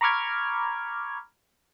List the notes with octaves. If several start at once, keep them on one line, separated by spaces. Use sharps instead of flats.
A#5 B5 C#6 D6 F6 G#6